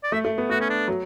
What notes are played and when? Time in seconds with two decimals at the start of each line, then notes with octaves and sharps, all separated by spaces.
0.03 D5
0.12 A3 E5
0.25 A3
0.38 B3
0.50 A3 F#4
0.61 C#4
0.70 D4
0.88 F#3